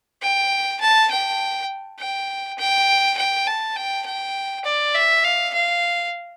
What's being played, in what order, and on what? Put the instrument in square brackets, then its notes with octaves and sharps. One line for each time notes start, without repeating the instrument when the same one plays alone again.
[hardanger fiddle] G5
A5
G5
G5
G5
G5
A5
G5
G5
D5
E5
F5
F5